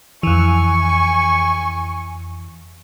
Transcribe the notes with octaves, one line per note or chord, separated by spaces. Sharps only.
F2 E3 G#5 C#6